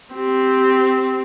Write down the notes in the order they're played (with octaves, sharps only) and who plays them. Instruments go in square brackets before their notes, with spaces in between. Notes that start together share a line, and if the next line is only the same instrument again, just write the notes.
[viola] C4 G4